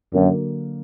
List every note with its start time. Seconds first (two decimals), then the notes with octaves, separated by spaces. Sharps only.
0.13 F#2 D3 F#3 A#3 D4 A#4